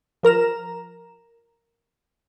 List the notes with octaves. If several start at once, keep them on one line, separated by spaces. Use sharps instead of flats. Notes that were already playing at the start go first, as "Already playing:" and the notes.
F3 A#4 A#5 E7